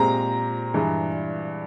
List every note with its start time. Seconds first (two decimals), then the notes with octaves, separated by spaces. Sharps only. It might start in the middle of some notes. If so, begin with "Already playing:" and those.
Already playing: A#2 G#3 C4 G4 A#5
0.74 G2 E3 G#3